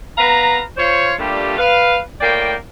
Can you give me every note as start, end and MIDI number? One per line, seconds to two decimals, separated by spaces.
0.18 0.61 59
0.18 0.61 71
0.18 0.61 77
0.18 0.61 82
0.77 1.13 65
0.77 1.13 72
0.77 1.13 73
1.19 1.57 55
1.19 1.57 57
1.19 1.57 58
1.19 1.57 62
1.19 1.57 65
1.19 1.57 67
1.58 1.98 71
1.58 1.98 77
2.21 2.55 45
2.21 2.55 58
2.21 2.55 74
2.21 2.55 79